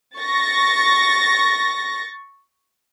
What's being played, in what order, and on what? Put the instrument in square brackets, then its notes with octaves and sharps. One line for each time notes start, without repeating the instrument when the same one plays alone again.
[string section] C#6 A6 A#6